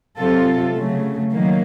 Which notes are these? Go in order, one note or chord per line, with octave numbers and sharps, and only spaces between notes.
C3 F#3 C4 F4 A4
C#3 F#3 A3
D#3 F#3 A#3